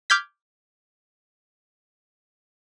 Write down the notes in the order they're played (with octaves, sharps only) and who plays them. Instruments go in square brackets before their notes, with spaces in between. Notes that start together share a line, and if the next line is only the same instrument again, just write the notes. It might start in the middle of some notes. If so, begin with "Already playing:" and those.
[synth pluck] D6 F6 G6 G#6 B6